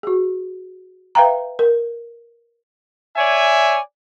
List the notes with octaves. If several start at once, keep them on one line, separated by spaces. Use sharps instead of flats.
F#4 G#4
B4 E5 F5 G5 A#5
A#4
C#5 D5 E5 G#5